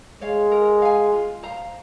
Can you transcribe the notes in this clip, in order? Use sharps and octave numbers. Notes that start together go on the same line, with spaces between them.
G#3 C#5 F5
A#4
F5 G#5
F4
C5 F5 A#5